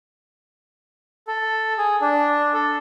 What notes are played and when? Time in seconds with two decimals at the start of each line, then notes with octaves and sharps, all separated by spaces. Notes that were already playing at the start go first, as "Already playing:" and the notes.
1.27 A4
1.78 G#4
2.01 D4
2.54 A4